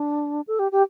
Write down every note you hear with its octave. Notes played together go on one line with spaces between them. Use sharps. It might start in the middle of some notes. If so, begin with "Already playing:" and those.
Already playing: D4
A4
G4
G4